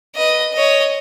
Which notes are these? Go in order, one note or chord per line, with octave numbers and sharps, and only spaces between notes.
B4 D#5
C#5 D#5